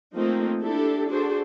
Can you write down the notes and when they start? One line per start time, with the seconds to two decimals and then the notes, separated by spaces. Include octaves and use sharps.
0.15 F3 A3 A#3 C4 D#4
0.62 D4 E4 G4 A4
1.10 D4 F#4 G#4 A4 C5